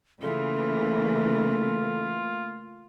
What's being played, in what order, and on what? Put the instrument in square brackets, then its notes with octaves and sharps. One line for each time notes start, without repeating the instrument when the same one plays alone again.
[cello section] C#3 E3 [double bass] A3 A#3 [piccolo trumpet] F4 [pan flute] A4